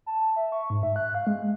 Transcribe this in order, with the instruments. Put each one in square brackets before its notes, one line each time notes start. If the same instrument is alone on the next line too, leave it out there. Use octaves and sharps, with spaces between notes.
[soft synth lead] A5
E5
C#6
G#2
E5
F#6
F5
G#3